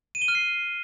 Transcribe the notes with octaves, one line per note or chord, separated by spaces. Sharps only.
D#7
G7
F6
C7